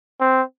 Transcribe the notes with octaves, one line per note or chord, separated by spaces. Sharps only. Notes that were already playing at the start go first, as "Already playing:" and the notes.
C4